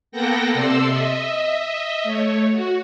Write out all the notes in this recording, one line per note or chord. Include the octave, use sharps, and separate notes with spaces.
A#3 B3 A4 F#5 G5 A#6
C3 A4 D5 C6 E6
D#5 E5
A3 C#5
F#4